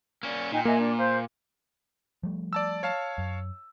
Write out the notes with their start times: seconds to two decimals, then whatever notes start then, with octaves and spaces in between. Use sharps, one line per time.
0.23 A#3 C#4 D5
0.52 A#2 D#4 G5 G#5
0.65 A#3 D#5 E5 G#5
0.78 D4 D5 D6
0.97 C5 F5
2.23 F3 G3 A3
2.53 D5 A5 E6
2.83 C#5 F5 A5
3.18 F#2